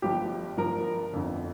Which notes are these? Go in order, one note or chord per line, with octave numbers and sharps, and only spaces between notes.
G1 G2 F3 G4
G1 G2 F3 A#4
G1 F2 D3